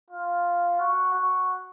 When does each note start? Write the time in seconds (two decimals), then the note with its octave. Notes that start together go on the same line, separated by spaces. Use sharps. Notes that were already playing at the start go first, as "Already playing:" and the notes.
0.10 F4
0.79 F#4
1.14 F#4